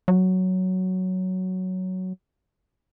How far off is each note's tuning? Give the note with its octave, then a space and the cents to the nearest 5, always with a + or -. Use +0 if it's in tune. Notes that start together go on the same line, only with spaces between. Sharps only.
F#3 +5